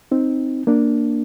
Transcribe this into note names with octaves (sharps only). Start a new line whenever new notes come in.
C4 D#4
A#3 D4